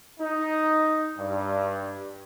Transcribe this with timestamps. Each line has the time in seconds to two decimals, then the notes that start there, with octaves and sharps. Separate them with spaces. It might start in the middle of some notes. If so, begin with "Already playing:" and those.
0.19 D#4
1.18 G2